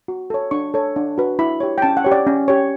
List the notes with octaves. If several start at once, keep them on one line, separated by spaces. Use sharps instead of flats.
F#4
A4 C#5
D4 C#6
A4 C#5
D4
F#4 B4
E4 B5
G4 C#5
G5
C#4 A5
F#5
G4 C#5
D5
C#4
G4 C#5